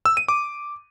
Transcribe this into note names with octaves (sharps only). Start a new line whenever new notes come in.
E6
D#7
D6